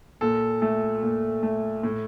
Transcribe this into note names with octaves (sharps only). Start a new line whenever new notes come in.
A#2 A4
A3 A4
A#2
A3
A2